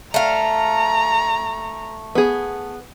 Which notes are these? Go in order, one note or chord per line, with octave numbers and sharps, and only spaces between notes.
A3 F5 A#5
B3 G#4